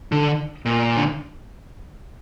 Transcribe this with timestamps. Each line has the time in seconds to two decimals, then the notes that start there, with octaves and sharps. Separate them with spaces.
0.12 D3
0.65 A#2
0.97 D3